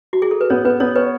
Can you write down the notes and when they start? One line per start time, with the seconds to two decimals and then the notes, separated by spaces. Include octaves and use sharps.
0.13 F#4
0.22 G#4
0.31 A4
0.41 B4
0.50 B3 C#5
0.65 B3 B4
0.80 B3 C#5
0.96 B4 C#5